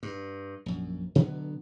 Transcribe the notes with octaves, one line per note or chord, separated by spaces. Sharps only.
G2
A#1 F#2
B2 D3 F#3 B3